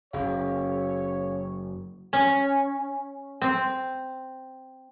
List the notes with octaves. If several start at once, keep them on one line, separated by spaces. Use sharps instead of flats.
F#1 C#4 G#4 C#5 F5
C#4
C4